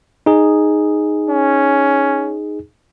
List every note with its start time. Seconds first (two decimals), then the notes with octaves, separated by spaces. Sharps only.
0.26 D#4 G#4
1.29 C#4